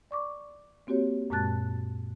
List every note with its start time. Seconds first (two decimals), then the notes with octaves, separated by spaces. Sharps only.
0.11 D5 C#6 D6
0.87 A#3 C4 F#4 G4 C#5
1.30 F#2 A#2 G#3 A5 F#6 A6